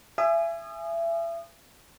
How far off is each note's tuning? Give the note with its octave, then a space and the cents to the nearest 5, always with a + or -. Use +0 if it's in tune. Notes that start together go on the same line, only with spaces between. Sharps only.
E5 +30 G#5 +0 D#6 -25